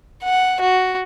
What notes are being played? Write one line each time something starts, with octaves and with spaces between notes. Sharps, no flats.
F#5
F#4